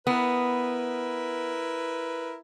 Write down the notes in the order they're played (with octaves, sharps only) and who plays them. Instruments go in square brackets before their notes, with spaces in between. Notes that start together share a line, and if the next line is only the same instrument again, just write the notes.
[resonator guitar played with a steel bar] B3 [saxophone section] E4 A#4 B4